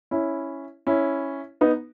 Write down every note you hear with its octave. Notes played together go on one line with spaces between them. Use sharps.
C#4 E4
C#4 E4
B3 D#4